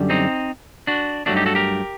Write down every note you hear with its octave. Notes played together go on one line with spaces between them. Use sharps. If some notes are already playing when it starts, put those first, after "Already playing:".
Already playing: F#2 D3 G3
C4 D#4
D4 F#4
G2 F#3 A3 D4 F#4
D#4 G4
F#4 A4
G4 A#4